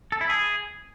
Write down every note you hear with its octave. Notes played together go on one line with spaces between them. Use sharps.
A4
E4
G#4